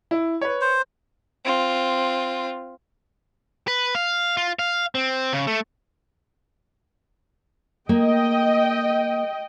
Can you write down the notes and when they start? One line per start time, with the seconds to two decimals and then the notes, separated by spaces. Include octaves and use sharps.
0.11 E4
0.41 B4 C#5
0.61 C5
1.45 C4 F4
3.68 B4
3.95 F5
4.37 F4
4.59 F5
4.95 C4
5.33 C#3
5.47 A3
7.89 A#3 D#5 G5